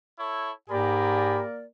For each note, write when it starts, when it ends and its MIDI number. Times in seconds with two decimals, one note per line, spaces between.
0.18 0.52 64
0.18 0.52 69
0.18 0.52 73
0.70 1.43 44
0.70 1.65 58
0.70 1.42 67
0.70 1.42 68
0.70 1.65 70
0.70 1.65 74
0.70 1.42 82
0.70 1.42 83